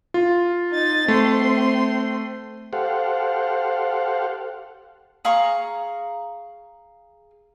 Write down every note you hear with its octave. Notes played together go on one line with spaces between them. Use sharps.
F4
D#4 A6
A3 C4 C6
G4 A4 C5 F5 F#5
G#4 F5 A#5 C#6